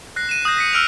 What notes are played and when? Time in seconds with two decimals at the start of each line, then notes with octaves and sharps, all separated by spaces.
0.16 F#6 A#6 C7
0.29 D#7 E7
0.45 D#6 F#6 G6 A#6
0.57 A#6 B6 C#7
0.73 E6 F6 D7 F7